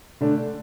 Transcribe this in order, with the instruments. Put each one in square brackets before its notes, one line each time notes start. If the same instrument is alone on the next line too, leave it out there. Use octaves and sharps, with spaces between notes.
[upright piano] D3 A3 D4